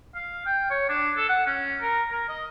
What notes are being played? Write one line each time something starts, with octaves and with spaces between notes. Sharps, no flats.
F5
G5
C#5
D4
A4
F#5
C#4
A#4
A#4
D#5